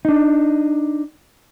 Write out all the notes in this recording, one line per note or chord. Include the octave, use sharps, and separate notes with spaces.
D4 D#4